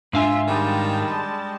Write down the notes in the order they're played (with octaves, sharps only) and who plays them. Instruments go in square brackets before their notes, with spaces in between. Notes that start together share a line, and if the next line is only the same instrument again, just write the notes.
[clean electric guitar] G#2 F5 G#5 [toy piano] D4 [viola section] F4 E5
[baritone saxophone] D#3 [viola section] G3 G#3 A5